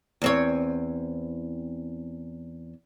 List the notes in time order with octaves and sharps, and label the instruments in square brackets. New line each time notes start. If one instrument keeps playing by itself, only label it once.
[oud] E2 C4 C#5